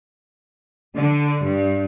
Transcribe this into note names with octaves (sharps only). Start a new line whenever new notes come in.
D3
G2